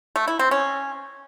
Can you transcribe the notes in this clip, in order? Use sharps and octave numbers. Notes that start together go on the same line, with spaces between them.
A3
E4
C4
C#4